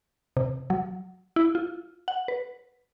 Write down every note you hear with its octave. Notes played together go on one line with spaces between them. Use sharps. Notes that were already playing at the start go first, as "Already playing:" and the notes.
C3
F#3
E4
F4
F#5
B4